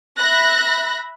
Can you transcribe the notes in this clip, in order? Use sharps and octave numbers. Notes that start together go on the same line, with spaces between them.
E5 B5 F#6 A#6